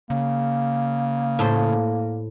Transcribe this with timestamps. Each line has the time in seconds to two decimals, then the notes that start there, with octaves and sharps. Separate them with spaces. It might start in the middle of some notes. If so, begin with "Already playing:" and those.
0.10 C#3 A#3
1.39 A2 A4 C5